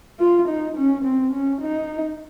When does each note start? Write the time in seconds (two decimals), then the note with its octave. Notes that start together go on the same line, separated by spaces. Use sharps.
0.19 F4
0.48 D#4
0.77 C#4
1.05 C4
1.33 C#4
1.61 D#4